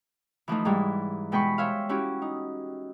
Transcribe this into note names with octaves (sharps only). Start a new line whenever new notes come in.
E3 F3 A3 D#4
G#2 E3 G3
B2 G#3 G5 B5 C#6
C5 C#5 E5 F5
C#4 E4 F#4 G4
D#4